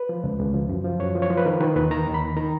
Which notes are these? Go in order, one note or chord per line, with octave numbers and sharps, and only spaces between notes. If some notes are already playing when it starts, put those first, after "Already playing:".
Already playing: B4
F3
C#2
C#2
F3
F#2
F3
F#2 C#5
F3
C#5
F3
B4
D#3 A#4
D#3 B4
D#2 B4
D#3 A#5
D#2
B5
D#3
D#3 A#5